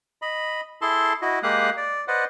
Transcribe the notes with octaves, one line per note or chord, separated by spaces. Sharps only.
D#5 B5
E4 G#4 A4 A5 C6
E4 F#4 D#5
G#3 A#3 G4 F5 D#6 F#6
D5
B4 C5 D5 D#5 F#5